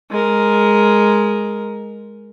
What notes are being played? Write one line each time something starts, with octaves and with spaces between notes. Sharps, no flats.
G#3 A#4